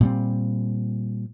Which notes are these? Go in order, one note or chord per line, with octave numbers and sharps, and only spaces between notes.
A#2 G3 C4